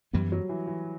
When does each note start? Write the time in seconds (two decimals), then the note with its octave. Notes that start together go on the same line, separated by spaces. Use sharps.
0.13 F#2 E3 G3 B3
0.32 F#3
0.49 E3
0.67 E3